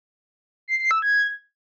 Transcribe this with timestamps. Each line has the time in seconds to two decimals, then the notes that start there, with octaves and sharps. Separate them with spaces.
0.68 C7
0.79 C7
0.91 E6
1.02 G#6